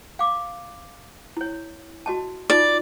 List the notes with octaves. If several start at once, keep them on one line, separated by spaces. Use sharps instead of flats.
F5 D6
E4 C#5
F#4 D#5 A5
D#4 F4 D5